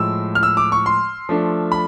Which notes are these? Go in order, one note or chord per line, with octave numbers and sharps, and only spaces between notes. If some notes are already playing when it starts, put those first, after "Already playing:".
Already playing: A2 F3 G#3 E6
F6
E6
D6
C#6
C6
F3 A3 D4
B5